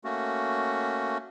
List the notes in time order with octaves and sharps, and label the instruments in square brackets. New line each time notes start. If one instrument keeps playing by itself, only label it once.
[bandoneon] A3 A#3 C#4 F#4